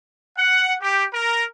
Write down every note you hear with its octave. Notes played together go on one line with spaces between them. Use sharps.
F#5
G4
A#4